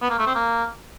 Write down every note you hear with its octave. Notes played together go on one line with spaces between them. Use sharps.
B3
A#3
A3
C4
A#3